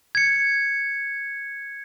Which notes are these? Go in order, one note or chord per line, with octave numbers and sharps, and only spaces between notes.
G#6 C#7